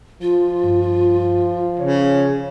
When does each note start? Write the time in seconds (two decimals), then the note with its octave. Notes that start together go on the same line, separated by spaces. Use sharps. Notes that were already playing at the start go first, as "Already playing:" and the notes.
0.22 F3 F4
0.63 G2
1.79 C#3 C#5